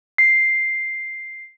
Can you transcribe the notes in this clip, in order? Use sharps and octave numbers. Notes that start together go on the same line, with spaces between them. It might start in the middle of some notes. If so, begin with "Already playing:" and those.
C7